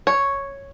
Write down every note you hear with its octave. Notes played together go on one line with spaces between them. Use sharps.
C#5